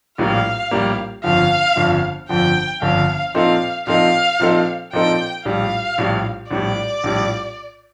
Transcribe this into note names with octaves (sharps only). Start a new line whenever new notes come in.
A#1 A2 G3 A#3 F5
A#1 A2 G3 A#3
G1 F2 D3 F3 F5
G1 F2 D3 F3
G1 F2 D3 F3 G5
G1 F2 D3 F3 F5
A#2 F3 C4 D#4 A4 F5
A#2 F3 C4 D#4 A4 F5
A#2 F3 C4 D#4 A4
A#2 F3 C4 D#4 A4 G5
A#1 A2 G3 F5
A#1 A2 G3
A#1 A2 G3 D5
A#1 A2 G3